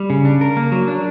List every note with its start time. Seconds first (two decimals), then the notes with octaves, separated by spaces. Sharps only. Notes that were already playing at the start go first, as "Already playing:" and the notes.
Already playing: G3
0.10 C#3
0.25 D4
0.41 A#4
0.57 A#3
0.72 F#3
0.88 D4